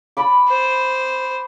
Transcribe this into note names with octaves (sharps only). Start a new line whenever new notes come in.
A5 B5 D6
C5